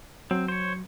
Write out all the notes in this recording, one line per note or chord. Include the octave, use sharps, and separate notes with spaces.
F#3 C4
C5 C#5